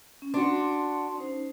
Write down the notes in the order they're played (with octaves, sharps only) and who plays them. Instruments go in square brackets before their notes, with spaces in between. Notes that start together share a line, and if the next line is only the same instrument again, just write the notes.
[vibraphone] C#4
[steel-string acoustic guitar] D4 F#4 [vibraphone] C6
[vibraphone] C#4 D#4 C5